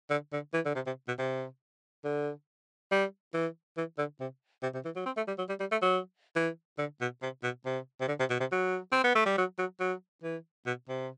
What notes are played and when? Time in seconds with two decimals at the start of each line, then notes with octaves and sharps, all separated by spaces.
0.10 D3
0.33 D3
0.54 E3
0.66 D3
0.76 C3
0.87 C3
1.08 B2
1.19 C3
2.04 D3
2.92 G3
3.34 E3
3.78 E3
3.98 D3
4.20 C3
4.63 C3
4.74 C3
4.85 E3
4.96 F#3
5.06 C4
5.17 A3
5.28 G3
5.38 F#3
5.49 G3
5.60 G3
5.72 A3
5.82 F#3
6.36 E3
6.78 D3
7.01 B2
7.22 C3
7.43 B2
7.66 C3
8.01 C3
8.08 D3
8.20 C3
8.30 B2
8.40 C3
8.52 F#3
8.92 C4
9.04 B3
9.15 A3
9.26 G3
9.38 F#3
9.59 F#3
9.80 F#3
10.23 E3
10.66 B2
10.89 C3